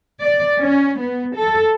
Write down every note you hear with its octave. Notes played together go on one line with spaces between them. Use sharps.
D5
C#4
B3
A4